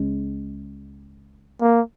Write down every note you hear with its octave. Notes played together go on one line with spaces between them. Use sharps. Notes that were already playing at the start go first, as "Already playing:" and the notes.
Already playing: C#2 C#3 G#3 C#4
A#3